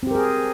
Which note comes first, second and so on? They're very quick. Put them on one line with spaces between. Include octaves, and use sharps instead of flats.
C4 G4 A#4 G#4